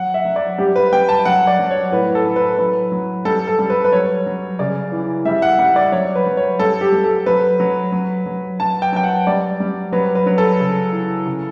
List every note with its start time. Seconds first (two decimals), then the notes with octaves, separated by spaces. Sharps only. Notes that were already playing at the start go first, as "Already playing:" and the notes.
Already playing: F#3 F#5
0.14 E5
0.25 F#3
0.36 D5
0.58 G3 G4
0.76 B4
0.93 G3 G5
1.09 A5
1.25 F#3 F#5
1.47 D5
1.59 F#3
1.71 C#5
1.92 A2 B4
2.15 A4
2.26 E3
2.36 B4
2.58 F#3 B4
2.92 F#3
3.25 G3 A4
3.48 A4
3.59 G3
3.70 B4
3.85 B4
3.92 F#3 C#5
4.26 F#3
4.59 C#3 D5
4.92 E3
5.25 G3 E5
5.42 F#5
5.59 G3 F#5
5.76 D5
5.92 F#3 C#5
6.15 B4
6.26 F#3
6.37 C#5
6.59 G3 A4
6.81 G4
6.92 G3
7.04 A4
7.26 F#3 B4
7.60 F#3
7.92 F#3
8.26 F#3
8.60 F#3 A5
8.82 G5
8.93 F#3 G5
9.03 F#5
9.27 G3 D5
9.60 G3
9.92 F#3 B4
10.15 B4
10.26 F#3
10.38 A4
10.60 C#3
10.93 E3
11.26 C#3